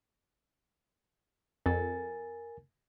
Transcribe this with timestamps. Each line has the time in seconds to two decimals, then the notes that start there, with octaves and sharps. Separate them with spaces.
1.66 F2 A#4 G#5 A6